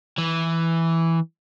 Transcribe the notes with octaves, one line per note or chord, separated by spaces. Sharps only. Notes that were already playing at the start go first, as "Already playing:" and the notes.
E3